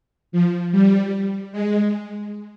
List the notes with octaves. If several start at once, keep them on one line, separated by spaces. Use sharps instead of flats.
F3
G3
G#3